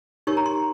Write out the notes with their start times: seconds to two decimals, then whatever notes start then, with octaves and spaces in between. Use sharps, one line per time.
0.27 D#4 G4 A#4 C#5 C#6
0.37 A#5
0.46 C6